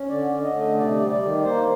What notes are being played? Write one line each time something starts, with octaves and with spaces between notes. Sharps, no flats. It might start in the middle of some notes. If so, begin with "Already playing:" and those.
Already playing: C#4
D3 D5
D3
D#5
A3
C3 D5
G3
D5
D#3
A#3 C5